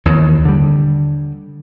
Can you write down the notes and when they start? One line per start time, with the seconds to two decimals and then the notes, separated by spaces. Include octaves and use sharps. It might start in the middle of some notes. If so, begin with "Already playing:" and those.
0.05 D#2 E3
0.45 D3 G3